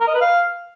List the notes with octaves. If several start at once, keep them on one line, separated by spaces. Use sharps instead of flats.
A#4
D#5
B4
F5